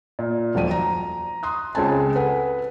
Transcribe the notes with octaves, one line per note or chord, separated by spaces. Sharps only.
A#2
D#1 B1 F2 D5 D#7
A#5
C6 D#6 F#6
C#2 C#3 G#3 C4 G#5 A5
A4 B4 F#5 G#5